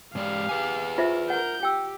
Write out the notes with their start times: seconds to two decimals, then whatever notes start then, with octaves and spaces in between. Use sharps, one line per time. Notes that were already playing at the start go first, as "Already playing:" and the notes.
0.15 G#2 G#3 G4 D5 F5
0.49 G#4 B4 G#5
0.98 F4 C5 E5
1.30 A#4 F#5 G6
1.63 G4 G5 E6